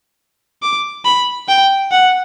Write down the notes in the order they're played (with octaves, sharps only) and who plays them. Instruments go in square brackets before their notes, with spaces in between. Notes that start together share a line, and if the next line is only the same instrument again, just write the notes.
[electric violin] D6
B5
G5
F#5